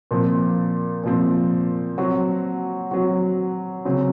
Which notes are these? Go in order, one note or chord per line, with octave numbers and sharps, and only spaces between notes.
A#2 F3 C4
A#2 F3 C4
F#3 C4 F#4
F#3 C4 F#4
C#3 F#3 C4